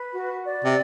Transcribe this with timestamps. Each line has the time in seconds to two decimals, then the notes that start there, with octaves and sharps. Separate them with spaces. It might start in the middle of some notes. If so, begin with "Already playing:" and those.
Already playing: B4
0.12 F#4
0.44 D5
0.64 C3